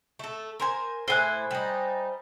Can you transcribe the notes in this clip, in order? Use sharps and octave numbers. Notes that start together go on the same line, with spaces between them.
A3 A4
A#4 C5 G#5
A2 E4 C5 G#5 F#6
G3 D#4